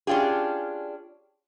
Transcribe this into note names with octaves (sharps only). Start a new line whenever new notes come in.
C#4 D4 F4 G4 G#4